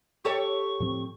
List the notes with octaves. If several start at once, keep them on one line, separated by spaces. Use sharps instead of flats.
G4 A4 C#5 C#6
A2 F3 C4